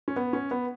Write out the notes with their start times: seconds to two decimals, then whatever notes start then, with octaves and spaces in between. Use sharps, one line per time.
0.08 C#4
0.16 B3
0.33 C#4
0.51 B3